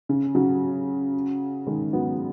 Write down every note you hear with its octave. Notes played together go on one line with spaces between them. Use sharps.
C#3
C#3 F#3
D#3 G#3
F#3 B3